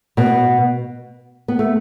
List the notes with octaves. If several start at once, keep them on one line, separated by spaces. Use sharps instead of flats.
B2 B3
B3
A3